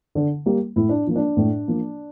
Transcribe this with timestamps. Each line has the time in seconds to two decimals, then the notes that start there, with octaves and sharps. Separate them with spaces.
0.15 D3
0.46 G3 A#3
0.76 A2 E4
0.89 D4
1.07 F3 A#3
1.16 D4
1.37 A2
1.68 F3 A#3